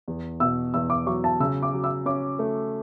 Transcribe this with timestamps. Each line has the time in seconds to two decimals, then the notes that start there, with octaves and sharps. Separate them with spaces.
0.08 E2
0.40 B2 E6
0.74 E2 E6
0.90 D6
1.06 F#3 C#6
1.24 A5
1.40 C#3 E6
1.63 D6
1.73 F#3
1.84 E6
2.06 C#4 D6
2.39 A3